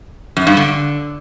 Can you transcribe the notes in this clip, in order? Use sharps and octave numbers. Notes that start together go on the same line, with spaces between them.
F#2
G2
D3